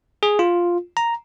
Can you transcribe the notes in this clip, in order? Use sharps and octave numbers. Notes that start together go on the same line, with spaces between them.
G#4
F4
A#5